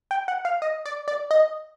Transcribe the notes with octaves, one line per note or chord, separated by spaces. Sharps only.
G5
F#5
F5
D#5
D5
D5
D#5